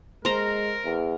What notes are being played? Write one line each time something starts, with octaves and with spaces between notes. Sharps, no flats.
G#3 A#4 C5 A#5
E2